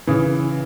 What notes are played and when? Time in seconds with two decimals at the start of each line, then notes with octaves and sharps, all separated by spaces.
0.07 C#3 E3